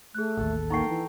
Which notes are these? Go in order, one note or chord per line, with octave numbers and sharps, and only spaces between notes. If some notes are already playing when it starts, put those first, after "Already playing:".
A3 G#4 F#6
A1 D#2 A4
A#3 D#4 G5 A#5 C#6 C7
E3